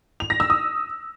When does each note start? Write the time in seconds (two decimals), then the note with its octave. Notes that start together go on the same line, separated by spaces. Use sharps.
0.20 F7
0.30 A#6
0.40 E6
0.50 D#6